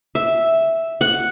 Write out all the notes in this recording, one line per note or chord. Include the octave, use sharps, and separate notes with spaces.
E5
F#5